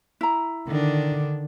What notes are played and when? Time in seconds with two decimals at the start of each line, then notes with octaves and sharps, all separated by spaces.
0.21 E4 A#5
0.68 D3 D#3 D4